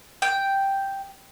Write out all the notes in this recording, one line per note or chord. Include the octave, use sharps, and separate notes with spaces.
G5